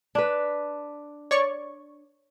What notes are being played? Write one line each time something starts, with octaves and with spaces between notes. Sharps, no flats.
D4 B4
C#5 D5 C#6